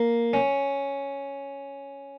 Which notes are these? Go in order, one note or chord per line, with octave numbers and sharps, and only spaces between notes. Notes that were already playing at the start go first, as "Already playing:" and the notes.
Already playing: A#3
C#4